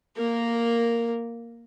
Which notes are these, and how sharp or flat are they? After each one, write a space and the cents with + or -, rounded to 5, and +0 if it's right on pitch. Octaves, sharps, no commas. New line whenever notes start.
A#3 +0 A#4 -5